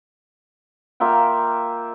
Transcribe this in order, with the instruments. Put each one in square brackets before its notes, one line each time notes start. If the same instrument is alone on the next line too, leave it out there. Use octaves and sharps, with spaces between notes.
[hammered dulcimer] A#3 F4 E5 G5